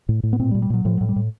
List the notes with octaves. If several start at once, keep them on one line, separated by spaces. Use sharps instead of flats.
A2
A2
B3
A#2 C4
G3
A#2
G3
A#2 F#3
A2 F3
A2 F#3
G3
A2